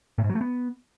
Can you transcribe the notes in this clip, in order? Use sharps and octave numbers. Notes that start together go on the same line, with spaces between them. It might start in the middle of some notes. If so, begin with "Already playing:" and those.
A2
G#2
F#3
A3
B3